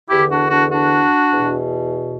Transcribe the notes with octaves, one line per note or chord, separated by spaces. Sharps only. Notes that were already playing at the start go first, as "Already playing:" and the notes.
E2 D3 E4 G4
D4 F#4
D4 F#4
D4 F#4
E2 B2